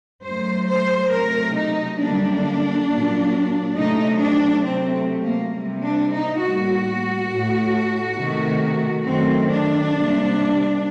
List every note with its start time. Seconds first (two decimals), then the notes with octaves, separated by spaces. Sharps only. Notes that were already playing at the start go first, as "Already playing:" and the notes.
0.24 F#2 F#3 A3 C5
0.67 C5
1.12 C3 F#3 A3 A#4
1.56 D#4
2.00 F#2 D3 G3 A#3 D4
2.89 A#2 F#3 A#3
3.76 C3 F#3 A3 D#4
4.20 D4
4.65 C3 F#3 A3 C4
5.24 A#3
5.53 C3 G3 A#3
5.82 D4
6.12 D#4
6.41 A2 G3 A#3 F#4
7.30 A2 A3
8.18 C3 D#3 A3
9.06 F#2 D#3 A3 C4
9.50 D4
9.94 C3 G3 A#3